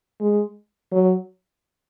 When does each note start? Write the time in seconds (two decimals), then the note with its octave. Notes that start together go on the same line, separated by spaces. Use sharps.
0.21 G#3
0.92 F#3